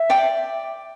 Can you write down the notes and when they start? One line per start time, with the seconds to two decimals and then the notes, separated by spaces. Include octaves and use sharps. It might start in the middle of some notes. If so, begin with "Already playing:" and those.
Already playing: E5
0.10 D5 G5 D6